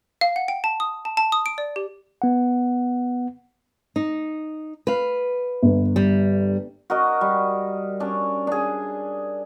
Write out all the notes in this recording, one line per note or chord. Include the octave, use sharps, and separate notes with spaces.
F5
F#5
G5
A5
D#6
A5
A5
D#6
D7
D5
G4
B3 F#5
D#4
B4 F5
G1
G3
F#4 A#4 D#5
G3
C#4 D4
D4 G#4